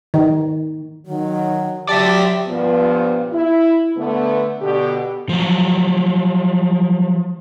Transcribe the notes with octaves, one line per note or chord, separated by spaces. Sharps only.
D#3
D#3 F#3
F#3 G4 D5 E5 A5
G2 A#2 F3 B3
E4
D3 A3 B3
B2 D3 G4
F3 F#3